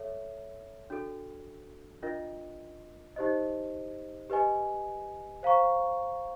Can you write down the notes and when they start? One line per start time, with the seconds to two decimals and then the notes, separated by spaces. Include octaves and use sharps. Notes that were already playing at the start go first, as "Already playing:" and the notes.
Already playing: A4 C#5 E5
0.90 D4 F#4 A4
2.02 D4 F4 A#4 D#5
3.16 D#4 G4 C5 D#5
4.30 G4 B4 D#5 G#5
5.43 C5 F5 A#5 C#6